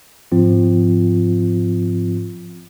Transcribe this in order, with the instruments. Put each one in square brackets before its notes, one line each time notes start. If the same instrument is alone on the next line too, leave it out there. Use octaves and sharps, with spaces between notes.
[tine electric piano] G#2 F3 C4 F4